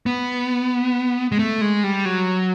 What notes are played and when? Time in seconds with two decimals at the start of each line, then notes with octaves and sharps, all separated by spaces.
0.06 B3
1.32 G#3
1.39 A3
1.61 G#3
1.84 G3
2.05 F#3